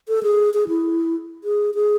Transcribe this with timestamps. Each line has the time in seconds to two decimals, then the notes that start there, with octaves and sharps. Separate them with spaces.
0.08 A4
0.23 G#4
0.54 G#4
0.68 E4
1.44 G#4
1.75 G#4